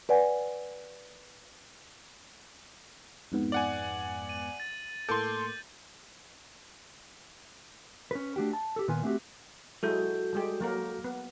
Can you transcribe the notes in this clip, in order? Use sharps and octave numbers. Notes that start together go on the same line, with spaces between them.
B4 D5 F#5 G#5
F2 G#2 B3
D5 F#5 G#5 F#7
D#7
A6
A2 A#3 A4 C6 D6 G6
C#4 B4
A3 D4 F#4 G4
A5
G4 A4
A#2 D#3 B3 F4 B4 G#5
A3 C4 D4 F#4 G4
F#3 G#3 E4 F#4 A4 G6
G3 G#3 G4
F#3 A#3 A#4
B3